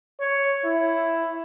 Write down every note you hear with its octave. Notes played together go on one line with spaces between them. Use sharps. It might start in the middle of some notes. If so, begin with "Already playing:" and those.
C#5
E4